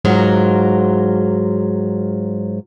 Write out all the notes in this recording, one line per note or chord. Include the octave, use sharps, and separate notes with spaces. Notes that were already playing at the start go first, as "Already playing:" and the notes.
G#2 F#3 F4 A#4